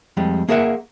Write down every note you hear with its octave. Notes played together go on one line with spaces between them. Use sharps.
F2 G3 G#3
A#3 G#4 A#4 E5 F#5